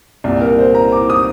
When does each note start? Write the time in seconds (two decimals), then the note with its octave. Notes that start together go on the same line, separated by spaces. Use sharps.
0.24 C2 A#2 D5
0.41 A#4
0.59 C5
0.74 A#5
0.92 D6
1.10 D#6